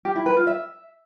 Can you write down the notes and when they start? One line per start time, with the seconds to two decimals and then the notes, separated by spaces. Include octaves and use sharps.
0.05 G4
0.16 E4
0.26 B4
0.36 F4
0.47 E5